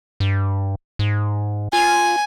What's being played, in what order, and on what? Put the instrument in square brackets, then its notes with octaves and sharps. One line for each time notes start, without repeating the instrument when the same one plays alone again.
[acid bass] G2
G#2
[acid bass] F4 [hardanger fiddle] G#5